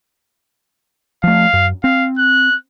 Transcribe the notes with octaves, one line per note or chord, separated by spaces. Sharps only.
F3 A3 F5
F#2
C4 F5
F#6